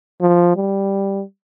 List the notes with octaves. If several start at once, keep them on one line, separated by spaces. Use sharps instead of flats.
F3
G3